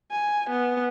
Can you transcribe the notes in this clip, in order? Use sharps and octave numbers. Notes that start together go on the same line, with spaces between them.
G#5
B3